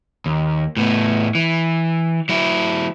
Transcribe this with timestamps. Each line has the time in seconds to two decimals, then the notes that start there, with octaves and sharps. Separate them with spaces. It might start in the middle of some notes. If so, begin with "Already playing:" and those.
0.26 D#2
0.77 A2 B3
1.35 E3
2.29 F#3 E4